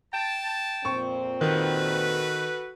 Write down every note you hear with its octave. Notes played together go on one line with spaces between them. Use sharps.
G5 A5
F2 A#2 C4 C#6
D#3 F#4 A4 B4